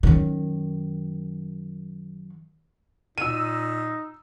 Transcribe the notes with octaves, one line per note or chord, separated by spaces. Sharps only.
F#2 D#3
A#2 D#4 E6 D#7